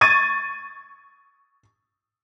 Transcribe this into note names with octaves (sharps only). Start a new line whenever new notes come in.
C#6 G#6 A6 D#7